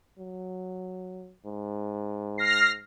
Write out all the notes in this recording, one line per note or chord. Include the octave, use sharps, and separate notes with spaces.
F#3
G#2
F6 A#6 C7